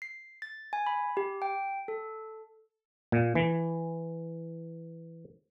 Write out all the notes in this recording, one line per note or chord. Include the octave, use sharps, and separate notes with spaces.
C7
A6
G#5
B5
G4
G5
A4
A#2
E3